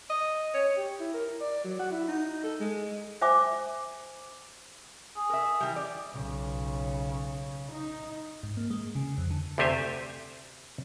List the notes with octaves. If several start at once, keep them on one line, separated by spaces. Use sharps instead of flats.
D#5
C#5
G4
E4
A#4
D5
F#3
F#4
E4
D#4
A4
G#3
C5 E5 G#5 D6
G#4
A#4 E5
E3 G3
D5
B1 C#3
D#4
G#2
A#3
G#3
C#3
F2
D3
D2 C3 A3 G4 C5 G#5